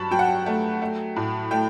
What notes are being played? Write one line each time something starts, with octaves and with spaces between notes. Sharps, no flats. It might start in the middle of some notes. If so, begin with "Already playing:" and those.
Already playing: G2 F#3 A5 B5 C#6
F#3 G5
F#5
G5
A3
A3
A2
A3 G5